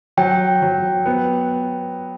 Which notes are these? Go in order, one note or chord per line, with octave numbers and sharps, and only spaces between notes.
F#3 G5
F#3
B3